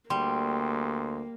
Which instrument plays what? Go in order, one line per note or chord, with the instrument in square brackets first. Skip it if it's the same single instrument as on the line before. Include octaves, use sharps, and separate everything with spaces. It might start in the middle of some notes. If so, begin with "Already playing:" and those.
[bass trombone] D2 [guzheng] G3 [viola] A#3 [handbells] C6